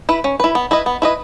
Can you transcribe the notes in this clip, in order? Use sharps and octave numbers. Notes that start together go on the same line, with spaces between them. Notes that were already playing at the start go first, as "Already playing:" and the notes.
E4 B4
C#4
E4 B4
B3
E4 B4 D#5
B3
E4 B4 D#5